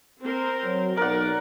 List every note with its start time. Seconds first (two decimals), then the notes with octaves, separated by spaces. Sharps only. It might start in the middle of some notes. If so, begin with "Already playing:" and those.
0.20 C4 A#4 C5
0.63 F#3
0.97 B1 A#4 D5 F#5